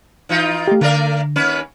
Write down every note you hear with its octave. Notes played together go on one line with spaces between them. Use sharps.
E3 D#4 F4
A3 G4
D3 A3 A#4 D5
D#2 C#4 B4